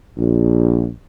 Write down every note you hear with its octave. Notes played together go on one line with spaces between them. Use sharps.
A#1